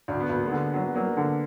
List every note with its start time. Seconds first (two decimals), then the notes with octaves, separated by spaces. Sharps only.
0.08 D2 D4
0.20 B3
0.29 D2 A#3
0.45 G#3 B3
0.52 D3
0.74 F#3 D4
0.84 B3
0.94 F#3 A#3 D4
1.17 D3